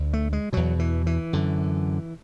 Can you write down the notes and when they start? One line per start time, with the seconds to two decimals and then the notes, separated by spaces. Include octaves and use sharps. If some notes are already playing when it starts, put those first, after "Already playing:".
Already playing: D2 D3
0.13 A3
0.33 G#3
0.53 E2 B2 F#3
0.79 E3
1.07 E3
1.33 F#2 D3